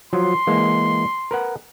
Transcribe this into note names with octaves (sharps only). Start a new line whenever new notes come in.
F3 F#3 C6
E3 G#3 A#3
A#4 B4 F#5